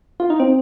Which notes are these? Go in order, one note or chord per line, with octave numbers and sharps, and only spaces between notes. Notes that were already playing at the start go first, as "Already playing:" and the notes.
F4
D#4
C4